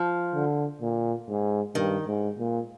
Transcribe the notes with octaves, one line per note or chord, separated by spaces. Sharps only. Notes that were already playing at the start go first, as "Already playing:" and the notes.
Already playing: F3
D3
A#2
G#2
G2 D#3
G#2
A#2